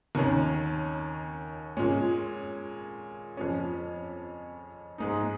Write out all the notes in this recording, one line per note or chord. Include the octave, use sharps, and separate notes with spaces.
D#2 D#3 C#4
A#2 G#3 C#4
F2 F3 C#4
G#2 G#3 D#4